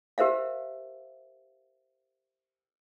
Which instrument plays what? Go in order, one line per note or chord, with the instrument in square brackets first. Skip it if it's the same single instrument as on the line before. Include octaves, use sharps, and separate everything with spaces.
[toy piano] G4 A#4 C5 E5 F5